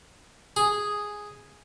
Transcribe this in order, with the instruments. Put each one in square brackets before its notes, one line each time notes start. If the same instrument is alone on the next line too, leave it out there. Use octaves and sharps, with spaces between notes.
[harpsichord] G#4